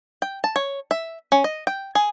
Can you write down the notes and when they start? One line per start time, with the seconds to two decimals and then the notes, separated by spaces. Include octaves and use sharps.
0.22 G5
0.44 A5
0.56 C#5
0.91 E5
1.32 C#4
1.44 D#5
1.67 G5
1.95 G#4